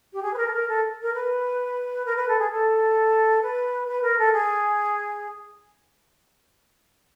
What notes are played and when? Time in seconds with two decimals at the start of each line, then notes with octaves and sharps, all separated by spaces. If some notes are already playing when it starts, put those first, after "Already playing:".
0.13 G4
0.22 G#4
0.33 B4
0.37 A#4
0.47 A4
0.52 A#4
0.68 A4
1.01 A#4
1.14 B4
2.05 A#4
2.16 B4
2.28 A4
2.38 G#4
2.51 A4
3.41 B4
3.87 B4
4.02 A#4
4.18 A4
4.32 G#4